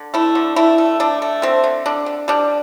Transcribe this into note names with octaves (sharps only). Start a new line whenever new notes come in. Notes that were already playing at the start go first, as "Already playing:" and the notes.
Already playing: D3
A3 E4
D3
A3 E4
A3
A3 D4
A3
D3 C4
D3
D3 D4
D3
G3 D4